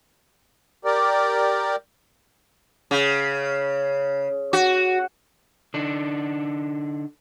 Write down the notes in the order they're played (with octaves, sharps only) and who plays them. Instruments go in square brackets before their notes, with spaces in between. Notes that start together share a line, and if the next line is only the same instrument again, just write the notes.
[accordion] G4 A#4 D5
[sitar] C#3
F#4
[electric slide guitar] D3 D4 D#4